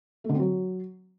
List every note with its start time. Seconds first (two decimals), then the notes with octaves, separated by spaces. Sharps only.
0.24 A3
0.29 D3
0.34 C4
0.39 F#3